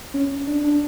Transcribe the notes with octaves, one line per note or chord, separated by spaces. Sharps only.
C#4
D4
D4